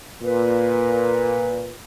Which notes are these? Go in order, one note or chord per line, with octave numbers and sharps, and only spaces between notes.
A#2 B4